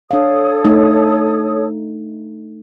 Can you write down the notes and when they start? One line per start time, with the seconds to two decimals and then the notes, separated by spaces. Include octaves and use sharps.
0.11 D4 A4 C#5 F5 D#6
0.65 A3 D#4